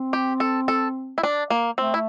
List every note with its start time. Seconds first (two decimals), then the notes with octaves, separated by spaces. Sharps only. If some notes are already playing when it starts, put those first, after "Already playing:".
Already playing: C4
0.13 G4
0.40 A4
0.68 A4
1.18 E4
1.23 D4
1.50 A#3
1.78 A3 C4
1.94 E4